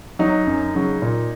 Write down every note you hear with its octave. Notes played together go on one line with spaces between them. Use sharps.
F#3 D#4
F#2
C#3 F#3
A#2